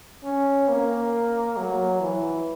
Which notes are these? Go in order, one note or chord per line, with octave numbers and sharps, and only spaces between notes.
C#4
A#3
F#3
E3